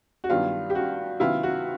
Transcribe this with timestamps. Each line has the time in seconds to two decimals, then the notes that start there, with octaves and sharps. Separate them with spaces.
0.24 F#4
0.29 G2 D#3 F#3 B3 D4 F4
0.70 G4
0.75 F#4
1.20 C3 D#3 F#3 B3 E4 F4
1.43 F#4